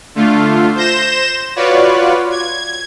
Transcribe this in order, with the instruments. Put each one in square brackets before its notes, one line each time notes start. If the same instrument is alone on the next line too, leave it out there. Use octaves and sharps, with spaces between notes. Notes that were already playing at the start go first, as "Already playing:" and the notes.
[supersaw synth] D3 A3 F4
C5 G6 A#6 E7
F4 F#4 B4 C#5 D5
G#6